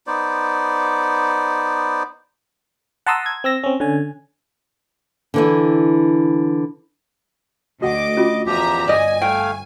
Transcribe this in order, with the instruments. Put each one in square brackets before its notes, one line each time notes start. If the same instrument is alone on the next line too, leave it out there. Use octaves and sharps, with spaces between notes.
[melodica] B3 D#4 C5 D5
[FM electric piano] F#5 A5 A#5 C6 D#6 E6
G#6
C4 E6 A#6
C4 C#4
D3 C#4 G#5
[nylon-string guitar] D3 E3 E4
[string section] D2 D6 [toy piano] F#4 F#5 [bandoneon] D#5
[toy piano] C#4 F4 F#4
[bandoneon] E2 F3 G4 [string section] D#5 E5 A#5
[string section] G1 G#5 [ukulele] D5 D#5
[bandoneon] A3 F5 [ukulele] G5